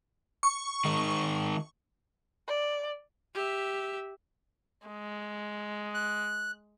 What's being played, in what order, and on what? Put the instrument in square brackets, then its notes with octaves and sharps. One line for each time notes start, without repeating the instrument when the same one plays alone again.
[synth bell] C#6
[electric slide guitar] D#3 G#3 D#4
[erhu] D5
[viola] G4 E5
[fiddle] G#3
[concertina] F#6